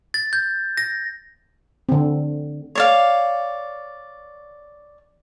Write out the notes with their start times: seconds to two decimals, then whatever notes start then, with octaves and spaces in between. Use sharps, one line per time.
0.14 A6
0.33 G6
0.77 A#6
1.89 D3 C4
2.75 C#5 D5 F5